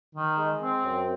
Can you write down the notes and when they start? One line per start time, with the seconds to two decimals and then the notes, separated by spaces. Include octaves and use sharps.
0.15 D#3
0.37 G#3
0.61 C4
0.84 F#2